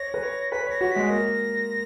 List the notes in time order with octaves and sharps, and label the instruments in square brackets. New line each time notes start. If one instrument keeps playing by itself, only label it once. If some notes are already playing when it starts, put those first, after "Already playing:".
Already playing: [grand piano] C#5 [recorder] A#6
[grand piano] B4
C#5
[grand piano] B4 [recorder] B6
[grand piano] C#5 [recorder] A#6
[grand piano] F#4
[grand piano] G#3 [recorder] B6
[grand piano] A#3 [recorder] A#6